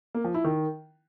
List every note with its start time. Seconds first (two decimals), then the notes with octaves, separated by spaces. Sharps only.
0.15 A#3
0.24 F3
0.34 E4
0.44 D#3